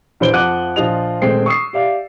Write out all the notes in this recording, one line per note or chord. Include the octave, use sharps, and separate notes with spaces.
A#1 E3 B4 C5 D7 G7
F2 F3 F#5 D6 F#6 D#7
A#1 F3 F4 D#5 F7
D#1 G#3 A3 C4 G5 C7
C#6 D#6 E6 C7
G4 D5 E5 F5